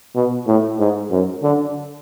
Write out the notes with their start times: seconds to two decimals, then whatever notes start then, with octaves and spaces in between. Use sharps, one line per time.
0.15 B2
0.47 A2
0.78 G#2
1.11 F#2
1.42 D3